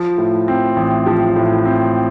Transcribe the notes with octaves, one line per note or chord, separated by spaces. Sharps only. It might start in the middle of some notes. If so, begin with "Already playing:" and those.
Already playing: F3
A2
C4
A1
F3
A2
C4